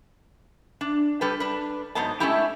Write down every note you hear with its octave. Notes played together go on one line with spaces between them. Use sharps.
D4
G3 G4 A4 B4
D4 B4
G#2 F#3 B3 C5 D#5 A5
G#3 A3 C#4 D4 E4 G4